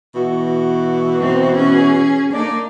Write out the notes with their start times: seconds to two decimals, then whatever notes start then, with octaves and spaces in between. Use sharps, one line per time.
0.15 B2 E3 F#4
1.18 C4 D#4
1.53 C#4 G#4
2.33 A#3 D4 D#4 D5